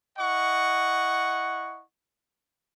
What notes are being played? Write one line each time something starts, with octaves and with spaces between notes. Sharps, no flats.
E4 D#5 F#5 C#6